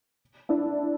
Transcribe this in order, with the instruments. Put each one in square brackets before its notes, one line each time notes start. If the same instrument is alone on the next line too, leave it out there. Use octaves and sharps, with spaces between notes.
[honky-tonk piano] D4 E4